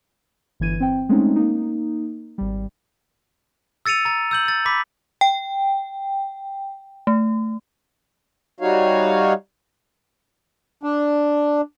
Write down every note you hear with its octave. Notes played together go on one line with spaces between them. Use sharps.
G1 E3 G#6 D#7
C4 G5
G#3 A3 C4 C#4 D#4
A#3 D#4
G#1 G3
E6 A6 C#7 D#7 F7
A#5 A6
E6 G6 F#7
E6 A6
B5 D6 B6
G5
A3
G3 D#4 F#4 C#5 F5
D4